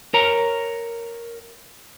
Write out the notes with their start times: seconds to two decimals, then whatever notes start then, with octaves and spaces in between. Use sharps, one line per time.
0.14 A#4 C#5 A#5